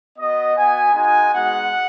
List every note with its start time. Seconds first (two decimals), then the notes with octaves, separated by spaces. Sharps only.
0.17 B3 F#4 D#5
0.55 B3 F#4 G#5
0.93 G#3 D#4 F#4 G#5
1.32 G#3 B3 D#4 F#4 F#5